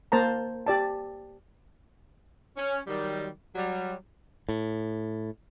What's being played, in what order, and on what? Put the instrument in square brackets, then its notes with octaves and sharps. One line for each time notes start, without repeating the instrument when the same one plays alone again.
[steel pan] A#3 C5 A5 A#5
G4 D5 A5
[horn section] C#4
D#3 F#3 G3
F#3 G3
[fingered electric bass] A2